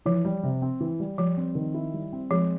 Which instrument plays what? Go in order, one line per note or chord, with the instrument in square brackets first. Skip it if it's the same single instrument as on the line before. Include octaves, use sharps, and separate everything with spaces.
[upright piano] E3 [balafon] F3
[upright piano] G3
C3
C4
E3
G3
[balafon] F3 [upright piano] G3
[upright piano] C4
D#3
E4
G3
C4
[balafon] F3 [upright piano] G#3